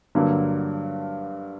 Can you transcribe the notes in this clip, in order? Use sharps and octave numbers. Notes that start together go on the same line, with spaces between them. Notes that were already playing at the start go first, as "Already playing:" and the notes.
G2 D3 F#3 A#3